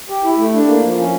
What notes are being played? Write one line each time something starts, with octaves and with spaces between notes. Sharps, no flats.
G4
E4
A3
D4
A#3
F3
C#4